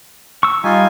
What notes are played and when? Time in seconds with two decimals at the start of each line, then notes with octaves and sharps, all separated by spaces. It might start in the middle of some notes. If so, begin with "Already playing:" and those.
0.43 C#6 E6
0.64 G3 D#4 F4 G#5